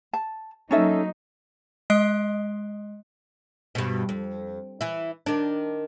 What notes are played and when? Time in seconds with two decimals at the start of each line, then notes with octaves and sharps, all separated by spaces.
0.13 A5
0.71 F#3 A#3 C#4 D#4 A4 E5
1.90 G#3 D#5 D#6 F#6 C7 D7
3.75 G2 B2
4.09 F2
4.81 E3 E4
5.26 D#3 D4